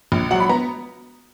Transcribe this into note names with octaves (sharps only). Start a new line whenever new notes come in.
A#1
F#3 F#5
B5
B3 A#5